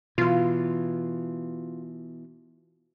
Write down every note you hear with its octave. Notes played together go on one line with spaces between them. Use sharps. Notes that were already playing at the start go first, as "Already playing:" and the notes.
B2 E3 F4